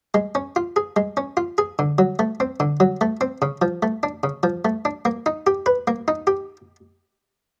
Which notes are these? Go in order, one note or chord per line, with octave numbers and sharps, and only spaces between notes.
G#3
C#4
F4
G#4
G#3
C#4
F4
G#4
D3
F#3
A3
C4
D3
F#3
A3
C4
C#3
F3
A3
D4
C#3
F3
A3
D4
A#3
D#4
G4
B4
A#3
D#4
G4